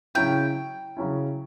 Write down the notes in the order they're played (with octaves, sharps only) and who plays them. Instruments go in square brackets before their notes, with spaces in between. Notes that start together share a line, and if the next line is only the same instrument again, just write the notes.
[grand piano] C#3 F#3 C#4 E4 [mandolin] G5
[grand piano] C#3 F#3 C#4 E4